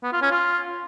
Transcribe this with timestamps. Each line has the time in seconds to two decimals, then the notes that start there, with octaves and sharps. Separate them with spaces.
0.03 B3
0.13 F4
0.22 C#4
0.31 F4